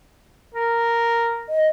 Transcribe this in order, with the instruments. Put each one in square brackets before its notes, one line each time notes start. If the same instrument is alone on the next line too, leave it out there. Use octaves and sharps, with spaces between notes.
[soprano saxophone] A#4
[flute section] D#5